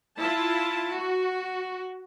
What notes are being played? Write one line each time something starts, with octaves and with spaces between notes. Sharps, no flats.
E4 F4 A5
F#4